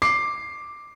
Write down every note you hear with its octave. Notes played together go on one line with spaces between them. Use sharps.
D6 C7